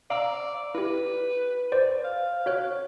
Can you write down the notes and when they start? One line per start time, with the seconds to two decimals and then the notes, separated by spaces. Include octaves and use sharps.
0.10 D5 F5 A#5 E6
0.75 E4 G4 B4
1.72 C5 D5
2.04 F5
2.46 F#4 C#5 F#6